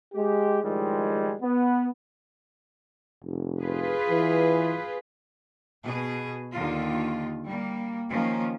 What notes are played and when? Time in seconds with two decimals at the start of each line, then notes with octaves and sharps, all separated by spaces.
0.14 G#3 G4
0.63 A2 D#3 F3 G3 G#3
1.42 B3
3.24 F1
3.62 F4 G#4 B4
4.10 E3
5.84 B2 G#4
6.52 D#2 D3 D#3 F4
7.46 G3 A#3
8.09 D#3 F3 A#3 C#4